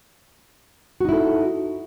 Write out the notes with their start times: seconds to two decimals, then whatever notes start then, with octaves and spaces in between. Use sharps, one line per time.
1.00 F#4
1.05 D#4
1.09 E4
1.13 A4